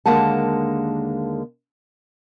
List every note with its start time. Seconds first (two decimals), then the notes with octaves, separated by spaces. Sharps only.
0.06 D#2 D3 G#3 A#3 F#5 A5